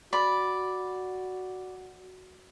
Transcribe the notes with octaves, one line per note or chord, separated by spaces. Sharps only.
F#4 D5 B5